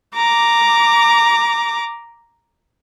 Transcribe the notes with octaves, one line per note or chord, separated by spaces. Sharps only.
A#5 D6